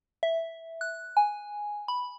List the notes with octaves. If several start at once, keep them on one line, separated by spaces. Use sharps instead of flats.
E5
F#6
G#5
B5